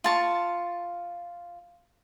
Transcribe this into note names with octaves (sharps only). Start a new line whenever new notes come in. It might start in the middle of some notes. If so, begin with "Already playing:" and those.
F4 A5 C#6